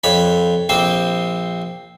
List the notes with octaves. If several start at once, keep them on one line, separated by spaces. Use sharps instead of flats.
F2 C#5 B5
A#1 C4 C5